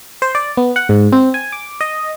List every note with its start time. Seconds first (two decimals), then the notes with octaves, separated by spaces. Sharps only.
0.22 C5
0.35 D5
0.57 B3
0.76 F#5
0.89 G#2
1.12 C4
1.34 G#5
1.52 D6
1.81 D#5